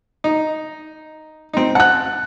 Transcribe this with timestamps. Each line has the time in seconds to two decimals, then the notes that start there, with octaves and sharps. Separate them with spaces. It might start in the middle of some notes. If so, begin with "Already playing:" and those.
0.24 D#4
1.53 C4 D#4
1.75 F#5 A5 F#6